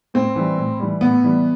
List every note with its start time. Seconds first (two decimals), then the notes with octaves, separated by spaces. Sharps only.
0.14 A2 C4
0.36 E3 G3
0.58 A2
0.80 E3 G3
1.01 A2 B3
1.24 E3 G3